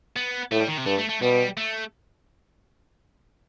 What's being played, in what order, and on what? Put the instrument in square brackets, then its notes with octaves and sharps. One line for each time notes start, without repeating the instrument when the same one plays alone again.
[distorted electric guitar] B3
[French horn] A2 [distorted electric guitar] A3
[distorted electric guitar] G3
D#3
C3
[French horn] G2 [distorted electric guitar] A3
[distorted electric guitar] A3
A3
[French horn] B2 [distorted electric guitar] G3
[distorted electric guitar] A3